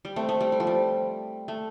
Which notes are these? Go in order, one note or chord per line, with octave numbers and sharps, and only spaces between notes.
G3
A3 C4
A3
G3
G3
F3
G3
A3